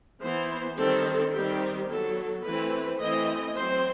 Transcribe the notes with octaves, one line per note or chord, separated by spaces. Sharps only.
E3 B3 C5
D#3 G3 C4 A4
D#3 G3 C4 G4
F#3 B3 A4
E3 A3 C4 B4
E3 A3 C4 D#5
F#3 C4 C5